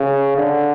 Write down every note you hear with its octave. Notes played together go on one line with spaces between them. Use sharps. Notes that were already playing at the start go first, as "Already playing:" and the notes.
Already playing: C#3
D3